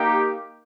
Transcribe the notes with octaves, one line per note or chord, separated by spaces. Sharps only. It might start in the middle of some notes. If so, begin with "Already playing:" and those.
Already playing: A#3 D#4 G4